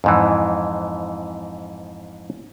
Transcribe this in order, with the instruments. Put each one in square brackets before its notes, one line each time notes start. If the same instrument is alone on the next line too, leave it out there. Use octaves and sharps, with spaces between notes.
[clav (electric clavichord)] F2 G#2 E3